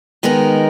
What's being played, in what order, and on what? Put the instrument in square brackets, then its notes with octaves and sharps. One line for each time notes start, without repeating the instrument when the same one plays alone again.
[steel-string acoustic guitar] D#3 G#3 B3 D#4 A#4